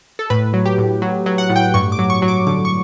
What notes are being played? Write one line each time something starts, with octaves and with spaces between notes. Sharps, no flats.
A4
A2 B4
F#3
G4
A2
F#3
F#3
F#5
A2
G5
G2 C#6
D6
F#3
C#6
F#3
D6
D3 D6
C#6